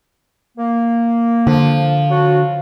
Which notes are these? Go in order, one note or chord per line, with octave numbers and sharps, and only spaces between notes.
A#3
D3 F3
F#3 D4 F#4